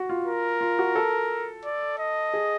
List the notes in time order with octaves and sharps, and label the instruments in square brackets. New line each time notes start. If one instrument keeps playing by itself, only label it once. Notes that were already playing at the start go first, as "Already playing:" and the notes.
Already playing: [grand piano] F#4
F4
[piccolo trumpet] A#4
[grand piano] F4
F#4
A4
[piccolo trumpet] D5
D#5
[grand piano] G#4